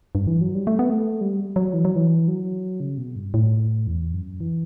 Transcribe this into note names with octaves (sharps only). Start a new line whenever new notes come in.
G2
E3
F#3
G3
A3
B3
A3
G3
F#3
E3
F#3
E3
F#3
C#3
B2
G2
A2
E2
F#2
E3